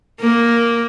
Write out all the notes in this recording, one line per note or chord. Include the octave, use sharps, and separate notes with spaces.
A#3